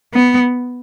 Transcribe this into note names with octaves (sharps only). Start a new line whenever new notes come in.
B3